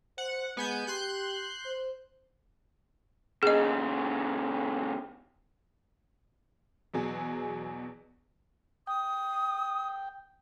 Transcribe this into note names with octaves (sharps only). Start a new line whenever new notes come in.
C5 F#5
G#3 B3 G#5 G6
G4 C6 F#6 G6
C5
A#2 C#3 G#4 D#5
E2 B2 F#3 G#4
G5 D#6